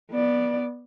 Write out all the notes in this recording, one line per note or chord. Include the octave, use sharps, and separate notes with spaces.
B3 D5